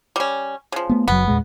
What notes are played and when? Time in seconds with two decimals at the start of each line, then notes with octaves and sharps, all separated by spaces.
0.16 G3 C#4
0.72 C#3 F3
0.89 A3 B3
1.08 F#1 F#2 F#3 B3
1.28 E2 A#2 G#3